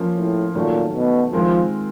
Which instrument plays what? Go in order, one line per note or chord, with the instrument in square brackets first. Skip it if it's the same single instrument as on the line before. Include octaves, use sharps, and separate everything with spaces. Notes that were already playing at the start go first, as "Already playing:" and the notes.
Already playing: [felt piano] F3 A#3 C#4 F4
[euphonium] A2
[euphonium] A#2 [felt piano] D#3 F#3 A3 C#4
[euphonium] B2
[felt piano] D#3 G#3 C4 F4 A#4 [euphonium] F3